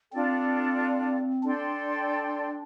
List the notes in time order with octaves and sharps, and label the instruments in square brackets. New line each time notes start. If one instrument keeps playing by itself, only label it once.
[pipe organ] C4 [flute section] D4 F4 A4 D5
[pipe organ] D4 [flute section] A4 D5 G5 C6